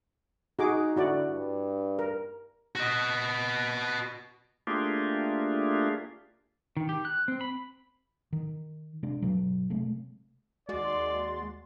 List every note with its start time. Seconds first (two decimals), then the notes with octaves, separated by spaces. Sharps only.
0.59 D#4 F#4 G#4 D6
0.96 D3 E4 F#4 D5
1.29 G2
1.99 A#4
2.75 F#4 D#5
4.67 A3 A#3 D4 F4 G4 G#4
6.77 D#3
6.89 G4
7.05 F#6
7.28 C4
7.41 B5
8.33 D#3
9.03 C3 G#3 D4
9.22 G1 B2 F#3
9.70 C3 G#3 A3
10.69 D#2 G#3 F#4 D5 C6 A6